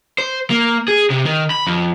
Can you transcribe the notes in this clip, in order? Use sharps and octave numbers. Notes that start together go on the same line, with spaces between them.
C5
A#3
G#4
C3
D#3
B5
F2